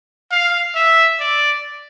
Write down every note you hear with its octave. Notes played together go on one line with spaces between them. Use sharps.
F5
E5
D5